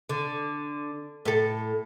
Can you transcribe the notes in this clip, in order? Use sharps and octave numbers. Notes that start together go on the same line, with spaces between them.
D3
A2 A4